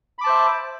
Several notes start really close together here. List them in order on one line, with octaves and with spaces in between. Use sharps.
B5 D6 A5 C5 E5